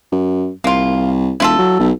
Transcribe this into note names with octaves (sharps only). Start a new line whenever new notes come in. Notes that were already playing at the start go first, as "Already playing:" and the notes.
F#2
C2 A#3 F4
E1 E4 F4 A4
F#3
B1